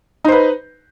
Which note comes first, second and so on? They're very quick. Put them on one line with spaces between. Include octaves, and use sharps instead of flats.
D#4 C5 B4